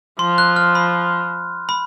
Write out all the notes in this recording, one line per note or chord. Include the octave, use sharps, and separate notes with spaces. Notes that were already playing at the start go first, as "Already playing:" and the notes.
F3 C6
F#6
F6
B5
B5